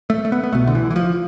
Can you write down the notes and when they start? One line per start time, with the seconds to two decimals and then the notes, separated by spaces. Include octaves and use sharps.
0.10 A3
0.25 A3
0.32 B3
0.43 B3
0.52 C2 B2 A3
0.67 D3
0.75 E3
0.90 E3
0.96 F3